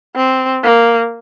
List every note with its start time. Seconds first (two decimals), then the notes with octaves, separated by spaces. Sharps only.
0.16 C4
0.63 A#3